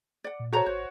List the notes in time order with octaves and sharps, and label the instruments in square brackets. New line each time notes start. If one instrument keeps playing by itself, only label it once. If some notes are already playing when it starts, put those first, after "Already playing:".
[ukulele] D5 F#5
[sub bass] A#2
[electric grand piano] F#4 C#5 [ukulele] A4 C5 A#5
[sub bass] G#1 [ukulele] C5